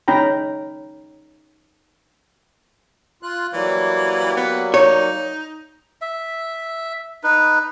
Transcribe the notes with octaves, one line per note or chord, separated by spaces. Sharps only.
C#4 D#4 G5 A#5 B5
F4 F#6
E3 F#3 G3 A#3
B3
D#4 C#5
E5
D#4 B4